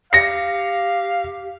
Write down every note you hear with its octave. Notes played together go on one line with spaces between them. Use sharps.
G4 F5 A#6 C#7